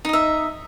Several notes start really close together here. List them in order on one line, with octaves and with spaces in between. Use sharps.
D#4 D#5 E5